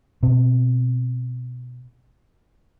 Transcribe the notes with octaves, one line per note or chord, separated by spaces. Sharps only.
B2 C4